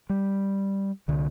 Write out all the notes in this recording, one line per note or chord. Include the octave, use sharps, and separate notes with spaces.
G3
C2 D3